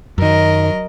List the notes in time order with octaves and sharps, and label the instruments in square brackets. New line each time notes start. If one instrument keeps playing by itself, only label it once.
[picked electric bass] F#2 D#3 [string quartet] F#3 A#4 D#5